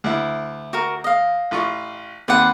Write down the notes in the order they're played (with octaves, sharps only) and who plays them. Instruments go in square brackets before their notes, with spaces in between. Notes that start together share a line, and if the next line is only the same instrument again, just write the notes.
[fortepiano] D2 E4
[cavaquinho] F#4 A#4
D#5 F5
[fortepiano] A1 F4 C#6
[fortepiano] D#2 C4 [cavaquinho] B4 D5 F#5